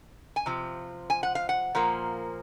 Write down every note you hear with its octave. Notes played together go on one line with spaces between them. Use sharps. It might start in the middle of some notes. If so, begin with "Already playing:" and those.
G#5
C3 F3
G#5
F#5
F5
F#5
A#2 F3 A#3